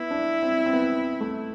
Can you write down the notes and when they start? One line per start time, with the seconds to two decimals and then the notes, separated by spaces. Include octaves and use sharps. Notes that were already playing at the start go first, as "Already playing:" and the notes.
Already playing: B3 E4
0.11 D4
0.42 C4
0.66 C4
0.73 B3
1.21 A3